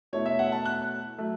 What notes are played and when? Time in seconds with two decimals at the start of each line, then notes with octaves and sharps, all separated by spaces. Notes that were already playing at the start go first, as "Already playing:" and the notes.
0.13 B2 A3 E4 C#5
0.26 E5
0.39 F#5
0.52 A5
0.66 F#6
1.18 F#3 A3